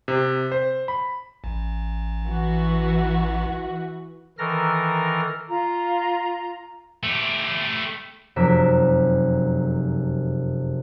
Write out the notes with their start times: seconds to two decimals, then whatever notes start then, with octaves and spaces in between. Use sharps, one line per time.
0.08 C3
0.52 C5
0.88 B5
1.44 A1
2.26 E3 F#4
4.38 D#3 E3 A4 A#4 F6 A#6
5.49 F4 A#5
7.03 A3 G4
8.36 F1 F#2 C3 A#4 B6 E7